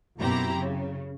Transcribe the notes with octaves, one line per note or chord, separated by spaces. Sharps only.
F#2 B2 C4 E4 G4 A#5
C#3